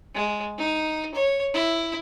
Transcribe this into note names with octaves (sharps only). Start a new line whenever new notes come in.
G#3
D#4
C#5
E4